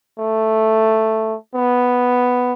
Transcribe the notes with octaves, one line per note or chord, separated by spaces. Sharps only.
A3
B3